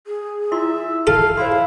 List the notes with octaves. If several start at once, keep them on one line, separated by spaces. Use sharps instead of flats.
G#4
E4 F4 E5 C6
A4 F5 A5
E4 C5 F5 C6